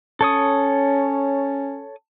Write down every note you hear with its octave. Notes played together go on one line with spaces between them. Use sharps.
C#4 A4 C#5 D#6